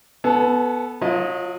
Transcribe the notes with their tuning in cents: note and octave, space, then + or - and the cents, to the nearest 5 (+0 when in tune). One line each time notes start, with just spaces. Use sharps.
B3 +0 A4 +0 G#5 +40
F#3 -35 F4 +0 D#5 +0